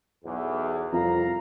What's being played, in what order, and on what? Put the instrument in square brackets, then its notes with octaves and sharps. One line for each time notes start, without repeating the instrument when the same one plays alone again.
[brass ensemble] B1 E2
[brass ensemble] C2 F5 A#5 [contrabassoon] F2